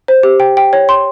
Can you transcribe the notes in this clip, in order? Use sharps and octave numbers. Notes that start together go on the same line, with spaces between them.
C5
G4
G5
G5
C#5
C6